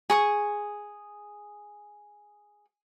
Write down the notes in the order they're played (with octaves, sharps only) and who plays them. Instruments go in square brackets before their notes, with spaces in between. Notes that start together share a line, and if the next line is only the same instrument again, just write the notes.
[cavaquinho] G#4 C#6 D#6